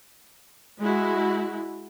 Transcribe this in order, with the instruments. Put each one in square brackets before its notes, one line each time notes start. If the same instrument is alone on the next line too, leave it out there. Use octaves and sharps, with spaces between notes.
[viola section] G#3 E4 F#4